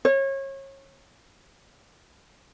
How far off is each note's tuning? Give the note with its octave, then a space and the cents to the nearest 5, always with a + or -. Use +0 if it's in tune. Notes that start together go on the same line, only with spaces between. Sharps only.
C#5 -30